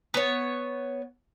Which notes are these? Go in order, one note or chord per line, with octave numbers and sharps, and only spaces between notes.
B3 C#5